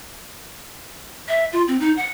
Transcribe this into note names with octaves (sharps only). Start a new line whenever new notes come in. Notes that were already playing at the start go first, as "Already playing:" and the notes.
E5
F4
C4
D#4
F#5